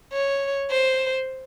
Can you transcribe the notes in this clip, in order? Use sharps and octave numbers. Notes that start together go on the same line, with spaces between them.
C#5
C5